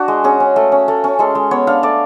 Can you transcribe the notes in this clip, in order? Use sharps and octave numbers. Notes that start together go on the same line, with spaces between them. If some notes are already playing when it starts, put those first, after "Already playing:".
Already playing: D4 F#4
G#3
C#4 G#4
C#4
A3
C#4
A3
C#4
G#3 A4
G#3
B3 C#5
D4 F5
A3 D5